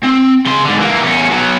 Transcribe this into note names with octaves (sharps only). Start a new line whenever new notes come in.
C4
C#3 C6
G#2 D3
E3 A#3
E2 C#4
B2 F#3